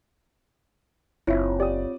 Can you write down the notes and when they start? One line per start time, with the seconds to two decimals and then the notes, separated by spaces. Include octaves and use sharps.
1.27 F#1 C4 E4 F4 C#5 E5
1.60 G4 D5 D#6